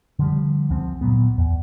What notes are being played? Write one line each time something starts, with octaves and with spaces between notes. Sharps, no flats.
D3 F3 G3
D2 F3 C4
D2 A#2 F#3 B3
E2